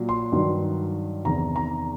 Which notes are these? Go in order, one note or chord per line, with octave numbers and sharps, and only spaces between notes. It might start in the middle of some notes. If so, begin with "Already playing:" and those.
Already playing: A#2 F#3
C6
G2 D#3 F#3
E2 C3 D#3 A#5
A#5